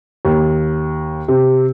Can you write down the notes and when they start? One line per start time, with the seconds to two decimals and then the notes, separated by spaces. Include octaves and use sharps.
0.25 D#2
1.28 C3